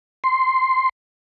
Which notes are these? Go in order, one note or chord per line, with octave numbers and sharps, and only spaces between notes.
C6